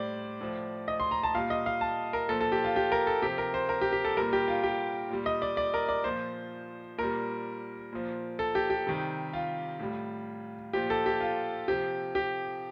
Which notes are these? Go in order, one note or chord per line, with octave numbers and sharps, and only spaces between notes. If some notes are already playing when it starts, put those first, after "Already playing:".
Already playing: A2 G3 C5 D5
A2 F3
D#5
C6
A#5
A5
A#2 G3 F5
D#5
F5
A5
A#4
A#2 F3 A4
A4
G4
F4
G4
A#4
A4
C3 F3 G4
A#4
C5
A#4
G4
G4
A4
A#2 G3 A#4
G4
F4
G4
A#2 G3
D#5
D5
D5
A#4
D5
A#2 F3 C5
A#2 G3 A#4
A#2 F3
A4
G4
G4
C3 D#3 G3
F4
A2 G3
A#2 F3 G4
A4
G4
F4
C3 F3 G4
G4